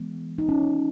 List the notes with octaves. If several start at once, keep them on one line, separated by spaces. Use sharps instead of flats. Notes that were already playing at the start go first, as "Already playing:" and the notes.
Already playing: E3 G#3 B3
D#4
C#4